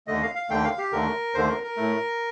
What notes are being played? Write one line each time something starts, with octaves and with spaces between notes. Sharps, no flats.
D#2 D3 A3 D#5
F5
F5
D#2 D3 A3 G5
F5
G4
D#2 D3 A3 A#4
D#2 D3 A3 C5
A#4
A#4
A2 A3